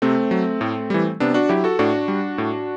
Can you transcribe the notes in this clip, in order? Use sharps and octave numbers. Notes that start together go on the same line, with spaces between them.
C3 A3 C4
F#3
A2
E3 G3
C3 B3 D4
D4 F#4
F#3 E4 G4
F#4 A4
A2 D4 F#4
G3
A2